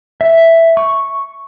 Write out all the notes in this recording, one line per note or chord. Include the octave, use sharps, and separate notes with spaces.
E5
C#6